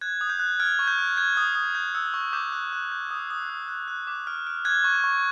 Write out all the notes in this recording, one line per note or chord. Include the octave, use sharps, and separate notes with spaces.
F#6 G#6
D#6
G6
F#6
F6 G#6
C#6
G6
F6
G6 G#6
D#6
D#6
G6
E6
C#6
D6 G6
F#6
F#6
G6
D#6
D#6
F#6
F#6
F#6
D6
F6
F6
F#6 G#6
C#6
C#6